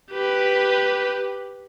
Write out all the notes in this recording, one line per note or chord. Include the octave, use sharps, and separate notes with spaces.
G4 B4